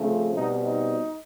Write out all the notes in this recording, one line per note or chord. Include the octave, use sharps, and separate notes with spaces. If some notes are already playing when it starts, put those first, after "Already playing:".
Already playing: C#3 F3 A3 C4
B2 G3 C4 D#4
D#4